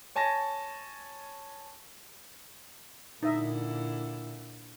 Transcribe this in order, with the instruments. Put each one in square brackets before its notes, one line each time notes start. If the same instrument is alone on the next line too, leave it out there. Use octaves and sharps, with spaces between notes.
[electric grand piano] C#5 G#5 A5 C#6 A#6
[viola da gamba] A#2 D3 E4 [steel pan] D#4 D#5 E5